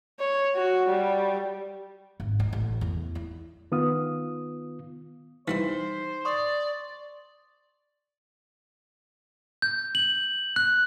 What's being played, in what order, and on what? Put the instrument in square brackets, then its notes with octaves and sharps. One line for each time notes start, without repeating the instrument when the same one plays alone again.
[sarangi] C#5
F#4
G3
[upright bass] G#1
D#4
A1
E2
E4
[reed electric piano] D#3 B3 F4 F5 D#6
[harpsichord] E3 G3 E4 [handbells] D#4 B6 [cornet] C5
[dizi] D5 [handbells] C6 C#6 D#6
[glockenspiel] G6
F#7
F#6